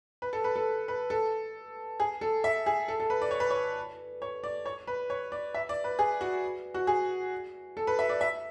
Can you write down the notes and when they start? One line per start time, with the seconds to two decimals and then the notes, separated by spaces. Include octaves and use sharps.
0.22 B4
0.33 A4
0.44 B4
0.56 A4
0.88 B4
1.10 A4
2.00 G#4
2.21 A4
2.44 E5
2.66 G#4
2.88 A4
3.00 A4
3.10 B4
3.22 D5
3.31 C#5
3.40 B4
3.50 C#5
4.22 C#5
4.44 D5
4.66 C#5
4.87 B4
5.10 C#5
5.32 D5
5.54 E5
5.69 D5
5.84 B4
5.99 G#4
6.21 F#4
6.74 F#4
6.87 G#4
7.77 A4
7.87 B4
7.99 E5
8.09 D5
8.21 E5